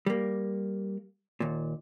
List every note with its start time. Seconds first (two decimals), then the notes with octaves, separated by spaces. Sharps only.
0.06 G3 A#3
1.40 D#2 A#2